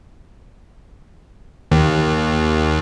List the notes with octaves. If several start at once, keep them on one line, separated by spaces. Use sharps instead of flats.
D#2